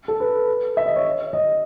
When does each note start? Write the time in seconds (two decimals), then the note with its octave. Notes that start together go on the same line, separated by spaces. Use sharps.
0.08 A4
0.20 B4
0.77 E5
0.86 D#5
0.96 C#5
1.33 D#5